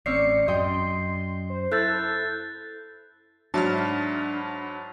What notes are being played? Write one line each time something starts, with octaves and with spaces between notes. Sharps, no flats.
A1 C4 C#4 D5 C7 C#7
F#2 D#5 G5 C6
C5
E4 A4 F#6 G6 A6
G#2 F#3 D4 E5 A5 B5 F6